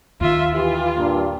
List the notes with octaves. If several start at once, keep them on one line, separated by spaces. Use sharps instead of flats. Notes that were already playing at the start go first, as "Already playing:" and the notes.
D#2 D#3 F4 E5
E3 F4 G4
G2 A#2